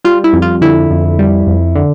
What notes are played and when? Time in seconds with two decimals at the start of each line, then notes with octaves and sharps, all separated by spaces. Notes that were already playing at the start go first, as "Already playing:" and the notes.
0.04 G3 F4
0.24 E4
0.33 F2
0.42 F4
0.61 D3 E4
0.90 F2
1.19 G3
1.47 F2
1.75 D3